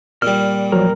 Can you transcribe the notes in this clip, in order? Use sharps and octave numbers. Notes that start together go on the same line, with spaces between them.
A#2 G3 F6
F3 F#3 A#4